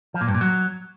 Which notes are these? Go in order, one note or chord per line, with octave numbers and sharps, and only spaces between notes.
F3
A#2
G2
A#2
F#3